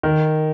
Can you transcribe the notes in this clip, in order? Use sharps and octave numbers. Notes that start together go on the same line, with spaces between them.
D#3